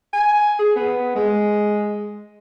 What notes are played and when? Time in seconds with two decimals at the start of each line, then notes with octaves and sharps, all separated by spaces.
0.13 G#5
0.59 G#4
0.76 B3
1.15 G#3